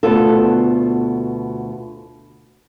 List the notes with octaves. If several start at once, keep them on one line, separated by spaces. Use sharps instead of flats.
D2 B2 B3 F4 A4